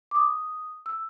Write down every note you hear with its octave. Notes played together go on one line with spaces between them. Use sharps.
D6
D#6
E6